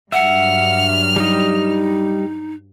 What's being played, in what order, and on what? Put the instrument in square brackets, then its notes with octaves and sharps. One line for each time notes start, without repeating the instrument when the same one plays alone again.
[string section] G2 F#3 [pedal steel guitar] E5 [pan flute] F#5 [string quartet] F6
[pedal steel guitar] G3 D#5 [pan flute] D#4